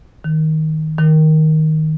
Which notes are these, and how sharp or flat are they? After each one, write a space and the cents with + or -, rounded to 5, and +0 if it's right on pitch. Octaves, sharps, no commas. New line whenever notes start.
D#3 +10
D#3 +5